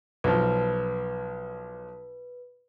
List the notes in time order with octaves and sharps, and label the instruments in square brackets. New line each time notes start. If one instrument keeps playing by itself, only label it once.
[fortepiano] B1 F3 [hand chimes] B4